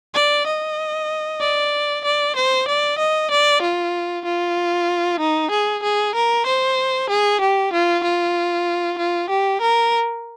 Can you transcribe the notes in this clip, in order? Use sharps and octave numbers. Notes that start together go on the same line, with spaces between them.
D5
D#5
D5
D5
C5
D5
D#5
D5
F4
F4
D#4
G#4
G#4
A#4
C5
G#4
G4
F4
F4
F4
G4
A#4